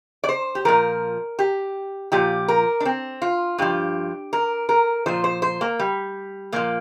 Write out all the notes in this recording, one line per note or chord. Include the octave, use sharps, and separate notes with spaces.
D5
C5
G4
A#2 F3 A#4
G4
A#2 F3 G4
A#4
D4
C4
F4
G2 F3 G4
A#4
A#4
A#2 F3 C5
C5
C5
A#3
G3
A#2 F3 A#3